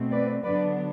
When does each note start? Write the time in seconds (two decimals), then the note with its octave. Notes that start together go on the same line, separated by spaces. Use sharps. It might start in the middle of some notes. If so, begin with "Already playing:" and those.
Already playing: B2 A3 C4
0.11 B4 D5
0.43 D3 F#3 B3 D4 B4 D5